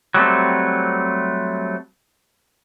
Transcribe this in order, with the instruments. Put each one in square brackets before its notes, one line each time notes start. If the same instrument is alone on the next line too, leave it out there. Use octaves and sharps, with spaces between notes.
[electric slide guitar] F#3 G3 A3 C4